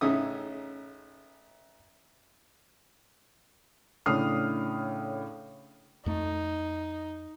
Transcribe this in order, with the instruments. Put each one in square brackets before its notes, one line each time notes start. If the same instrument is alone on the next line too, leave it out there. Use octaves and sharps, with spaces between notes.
[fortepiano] A1 C#3 C#4 D#4 E5 D#6
[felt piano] A2 C#3 D4 D#6 F6 C7
[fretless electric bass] F2 A3 [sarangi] D#4